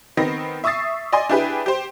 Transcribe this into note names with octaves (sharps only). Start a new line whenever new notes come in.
D#3 B3 C4 A#6
E5 C#6 D#6 E6 A6 C7
D5 D#5 G#5 C6
D4 E4 G4 G#4 B4
G4 C5